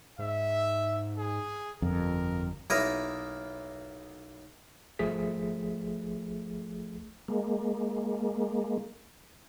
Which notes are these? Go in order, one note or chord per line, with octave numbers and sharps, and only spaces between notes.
G#2 E5
G#4
G1 F2 A#4
B1 A#3 E4 A#4 D#6
G#1 F3 A3 G#4 B6
G#3 A#3